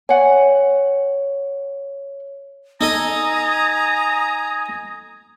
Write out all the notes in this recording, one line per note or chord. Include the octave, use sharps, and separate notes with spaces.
C#5 D5 F#5 G#5
D#4 A4 D#5 G#5 A#5 D#6